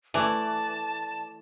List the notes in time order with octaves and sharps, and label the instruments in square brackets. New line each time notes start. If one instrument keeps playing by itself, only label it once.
[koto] E3 [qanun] A3 [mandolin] D5 [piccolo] A5